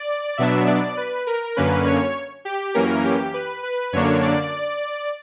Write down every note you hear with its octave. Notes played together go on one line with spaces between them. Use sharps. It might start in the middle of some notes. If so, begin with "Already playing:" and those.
Already playing: D5
B2 F#3 B3 D4 E5
D5
B4
A#4
F#2 D3 A#3 C#4 B4
C#5
G4
F#2 E3 A#3 C#4 A#4
G4
B4
B4
F#2 D3 A#3 D4 C#5
D5